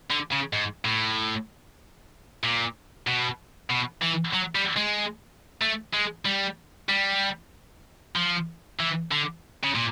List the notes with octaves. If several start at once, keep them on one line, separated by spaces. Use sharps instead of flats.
D3
C#3
G#2
A2
A#2
B2
B2
E3
F#3
G3
G#3
A3
G#3
G3
G3
F3
E3
D3
C#3
A#2